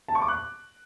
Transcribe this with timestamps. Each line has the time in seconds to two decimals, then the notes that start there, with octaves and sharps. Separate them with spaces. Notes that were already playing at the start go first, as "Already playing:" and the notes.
0.08 A5
0.15 C#6
0.22 D6
0.28 F#6